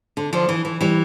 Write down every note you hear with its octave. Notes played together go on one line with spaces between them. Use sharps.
D3
D3 F3
E3
E3
E3 G3